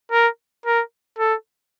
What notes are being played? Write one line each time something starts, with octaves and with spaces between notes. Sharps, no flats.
A#4
A#4
A4